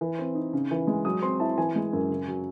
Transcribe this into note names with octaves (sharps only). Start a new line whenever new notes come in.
E3
C4
D#4
C#3
E3
G#3
F#3 D#6
C4 C6
E4 A5
E3 G#5
G#3
F#2
C#3
F#3